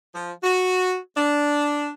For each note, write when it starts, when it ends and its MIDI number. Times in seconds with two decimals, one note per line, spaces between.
0.15 0.32 53
0.43 0.98 66
1.17 1.89 62